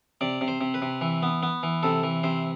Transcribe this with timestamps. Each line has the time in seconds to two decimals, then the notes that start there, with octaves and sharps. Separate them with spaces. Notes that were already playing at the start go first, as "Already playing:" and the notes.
0.21 C3 D5
0.41 C3
0.48 C5
0.61 C3
0.74 B4
0.82 C3
1.01 E3
1.23 B3
1.43 B3
1.63 E3
1.83 C3 A4
2.03 E3
2.23 C3 C5